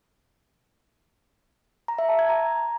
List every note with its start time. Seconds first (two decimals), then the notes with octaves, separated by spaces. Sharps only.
1.88 A#5
1.99 E5
2.09 A5
2.19 G#6
2.29 A#5